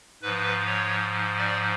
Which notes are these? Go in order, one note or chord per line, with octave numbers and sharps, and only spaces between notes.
G#2 F3 B4
C#5
D5